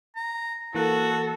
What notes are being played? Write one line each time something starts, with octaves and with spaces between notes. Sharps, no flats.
A#5
E3 A#3 F#4 A4 F#6